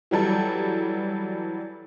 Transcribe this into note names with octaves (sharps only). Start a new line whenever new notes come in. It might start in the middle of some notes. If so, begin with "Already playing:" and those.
E3 F#3 G3 A4